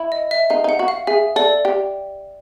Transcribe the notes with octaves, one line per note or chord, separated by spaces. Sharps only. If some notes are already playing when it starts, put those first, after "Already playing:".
Already playing: E4
D#5
E5
D#4 F5
D#4 F#5
F#4
F5
G#4 E5
A4 D5
G4